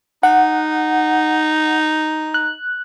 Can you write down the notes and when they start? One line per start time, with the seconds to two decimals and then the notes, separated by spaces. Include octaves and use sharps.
0.23 D#4 F#5
2.34 F#6